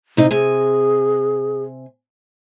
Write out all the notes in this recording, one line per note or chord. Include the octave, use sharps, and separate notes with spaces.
C3 D#4
C3 G#4 G#5